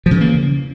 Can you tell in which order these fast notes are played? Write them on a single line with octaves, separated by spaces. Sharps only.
F3 C#3 E3 A#3